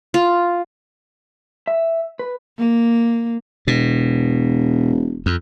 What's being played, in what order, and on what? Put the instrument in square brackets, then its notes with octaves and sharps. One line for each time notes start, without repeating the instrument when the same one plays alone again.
[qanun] F4
[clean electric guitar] E5
B4
[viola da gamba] A#3
[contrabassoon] E1 [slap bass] B2
[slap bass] F2